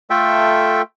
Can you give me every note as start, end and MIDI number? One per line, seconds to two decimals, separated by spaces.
0.10 0.82 57
0.10 0.82 65
0.10 0.82 69
0.10 0.82 76
0.10 0.82 79